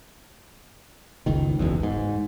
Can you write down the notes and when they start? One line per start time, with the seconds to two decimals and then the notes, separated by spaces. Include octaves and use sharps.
1.26 F#1 C#2 D#3
1.59 F#1 B1 E2
1.83 G#2